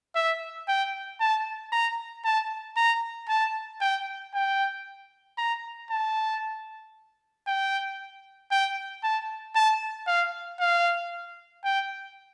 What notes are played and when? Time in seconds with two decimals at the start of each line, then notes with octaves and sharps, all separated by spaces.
0.16 E5
0.68 G5
1.20 A5
1.72 A#5
2.25 A5
2.77 A#5
3.29 A5
3.81 G5
4.34 G5
5.38 A#5
5.90 A5
7.47 G5
8.51 G5
9.04 A5
9.56 A5
10.07 F5
10.60 F5
11.64 G5